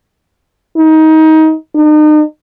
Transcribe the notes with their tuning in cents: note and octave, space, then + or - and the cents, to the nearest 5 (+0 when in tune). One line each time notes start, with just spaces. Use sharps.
D#4 +20
D#4 -40